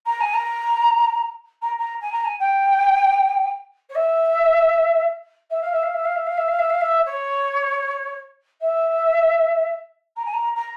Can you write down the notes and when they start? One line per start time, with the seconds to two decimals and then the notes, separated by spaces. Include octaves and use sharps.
0.06 A#5
0.20 G#5
0.33 A#5
1.62 A#5
1.78 A#5
2.00 G#5
2.12 A#5
2.24 G#5
2.39 G5
3.89 C#5
3.95 E5
5.50 E5
5.61 F5
5.72 E5
5.82 F5
5.93 E5
6.04 F5
6.15 E5
6.26 F5
6.37 E5
6.47 F5
6.59 E5
6.69 F5
6.80 E5
7.05 C#5
8.61 E5
10.16 A#5
10.25 G#5
10.33 A#5
10.55 A#5